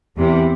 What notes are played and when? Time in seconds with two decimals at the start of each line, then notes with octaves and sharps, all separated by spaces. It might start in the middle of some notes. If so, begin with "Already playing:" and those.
0.17 E2 C3 E3